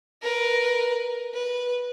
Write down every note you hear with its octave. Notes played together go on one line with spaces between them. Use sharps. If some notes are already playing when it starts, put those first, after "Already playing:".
A#4 B4
B4